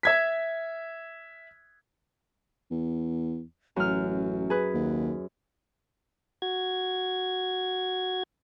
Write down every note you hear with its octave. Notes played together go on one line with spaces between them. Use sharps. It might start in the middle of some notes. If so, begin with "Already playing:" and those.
E5 G#6 B6
E2
A1 F#2 F6
G#4 B4
D#2
F#4 G#6